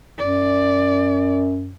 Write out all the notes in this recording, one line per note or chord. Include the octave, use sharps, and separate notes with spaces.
F#2 D5